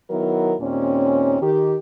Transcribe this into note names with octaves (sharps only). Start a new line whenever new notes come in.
D#3 F#3 B3 E4 A#4
D#2 A#2 C4 C#4
D#3 G4